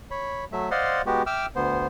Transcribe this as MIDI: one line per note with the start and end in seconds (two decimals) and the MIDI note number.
0.11 0.45 73
0.11 0.45 83
0.52 0.70 54
0.52 0.70 57
0.52 0.70 76
0.71 1.02 72
0.71 1.02 74
0.71 1.02 75
0.71 1.02 77
0.71 1.02 78
0.71 1.02 84
1.06 1.22 56
1.06 1.22 59
1.06 1.22 66
1.06 1.22 67
1.26 1.46 76
1.26 1.46 79
1.26 1.46 86
1.26 1.46 88
1.26 1.46 89
1.56 1.87 38
1.56 1.87 59
1.56 1.87 72